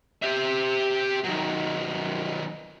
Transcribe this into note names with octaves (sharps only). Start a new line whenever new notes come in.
G4 E5
D#3 F#3